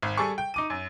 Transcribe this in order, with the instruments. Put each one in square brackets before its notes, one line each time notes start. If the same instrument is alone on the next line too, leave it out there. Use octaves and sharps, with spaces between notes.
[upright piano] G#1
G3 G#4 A4 G#5 C#6
G5
D#4 D6 D#7
F#2